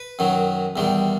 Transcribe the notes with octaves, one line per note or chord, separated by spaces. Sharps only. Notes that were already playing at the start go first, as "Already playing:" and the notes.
Already playing: B4
F#2 D#3 F#3
E2 D#3 G3